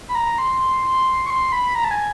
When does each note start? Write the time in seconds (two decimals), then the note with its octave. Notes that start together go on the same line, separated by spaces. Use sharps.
0.09 B5
0.15 A#5
0.38 C6
1.26 C#6
1.30 C6
1.52 B5
1.75 A#5
1.84 A5
1.91 G#5